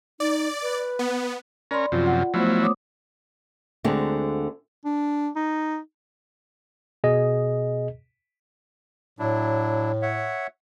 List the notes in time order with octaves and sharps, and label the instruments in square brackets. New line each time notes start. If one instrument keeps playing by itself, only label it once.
[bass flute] D#4 [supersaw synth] D5
[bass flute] B4
[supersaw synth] B3
[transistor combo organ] C#4 A#4 [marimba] D5 B5 C6
[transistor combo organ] F#2 C3 F3 [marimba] F4
[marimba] F#5
[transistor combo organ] F3 F#3 E4 [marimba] A3 B3 C5
[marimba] C#5 D6 D#6
[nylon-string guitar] D2 D3 G#3 C4
[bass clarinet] D4
D#4
[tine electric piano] B2 G#4 D#5
[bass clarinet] A2 [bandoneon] F#3 D4 E4
[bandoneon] C#5 E5 F#5